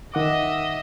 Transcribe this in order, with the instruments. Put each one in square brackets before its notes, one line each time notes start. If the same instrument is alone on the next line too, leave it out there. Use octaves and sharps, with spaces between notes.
[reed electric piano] D#3 F#5 D6 [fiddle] D#5 E5